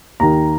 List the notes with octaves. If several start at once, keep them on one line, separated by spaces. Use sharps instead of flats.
D#2 D#3 A#5